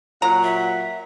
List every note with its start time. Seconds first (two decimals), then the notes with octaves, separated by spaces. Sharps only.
0.22 A#2 F#3 F#5 A#5
0.43 E5